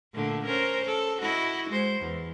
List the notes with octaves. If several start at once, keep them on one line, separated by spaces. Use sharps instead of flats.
A#2 D3 A3
C#4 A#4 C5
A4
E4 F#4 D#5
G#3 C5
E2